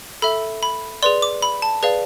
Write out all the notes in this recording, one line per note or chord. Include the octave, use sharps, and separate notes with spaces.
A4 E5 B5
B5
G#4 B4 D5 C6
D6
B5
A5
G#4 B4 D5 F5